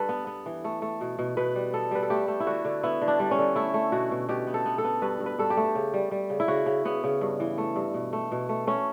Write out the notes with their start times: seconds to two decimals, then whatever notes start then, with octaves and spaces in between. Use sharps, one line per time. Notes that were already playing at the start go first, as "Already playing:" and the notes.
Already playing: G2 A4 B4
0.09 B3
0.27 B3
0.46 E3
0.64 A3
0.82 A3
1.01 B2
1.19 B2
1.37 B2 B4
1.55 G3
1.74 B3 A4
1.91 G3 B4
2.03 A4
2.10 A3 G4
2.28 A3
2.40 E4
2.46 D3 F#4
2.65 D3
2.83 B3 E4
3.01 D3
3.08 D4
3.20 G3
3.31 C#4
3.38 D3
3.56 A3 E4
3.74 A3
3.92 B2 F#4
4.11 B2
4.29 B2 G4
4.47 B3
4.54 A4
4.66 B3
4.78 A4
4.84 B3
5.02 G2 B4
5.20 G2
5.26 B4
5.39 G2 A4
5.50 G4
5.57 A3
5.75 C#3
5.94 G3
6.11 G3
6.30 C#3
6.40 E4
6.48 C#3 F#4
6.66 C#3
6.85 C#3 B3
7.04 C#3
7.21 G2
7.40 E3
7.58 A3
7.76 G2
7.94 B2
8.13 A3
8.32 B2
8.49 A3
8.67 A3 C#4